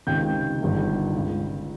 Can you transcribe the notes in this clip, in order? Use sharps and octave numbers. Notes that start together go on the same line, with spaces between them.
C#2 C3 D#3 G5 G6
G1 G2 D#3
C#2 C#3